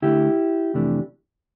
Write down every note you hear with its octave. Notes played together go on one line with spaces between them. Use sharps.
D2 D3 A3 E4 G4
F2 C3 E3 A3 D4